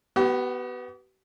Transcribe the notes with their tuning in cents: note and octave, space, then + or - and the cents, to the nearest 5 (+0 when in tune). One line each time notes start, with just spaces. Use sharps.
B3 +0 G4 -45